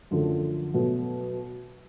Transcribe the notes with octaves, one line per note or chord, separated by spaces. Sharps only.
F#2 D3 F3 A3
B2 F#3 A3